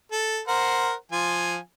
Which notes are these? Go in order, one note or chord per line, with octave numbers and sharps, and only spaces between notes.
A4
A#4 C5 F#5
F3 F4 G#5